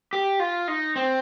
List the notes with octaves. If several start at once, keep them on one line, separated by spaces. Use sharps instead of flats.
G4
F4
D#4
C4